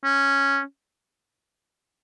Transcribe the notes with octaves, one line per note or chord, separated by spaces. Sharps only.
C#4